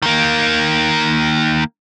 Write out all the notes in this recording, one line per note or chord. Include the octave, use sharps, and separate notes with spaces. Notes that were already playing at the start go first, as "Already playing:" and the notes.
D#3 A#3